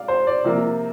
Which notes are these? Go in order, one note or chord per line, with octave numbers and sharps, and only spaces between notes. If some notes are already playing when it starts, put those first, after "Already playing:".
Already playing: D5 F5
C5
D5
C3 F3 A#3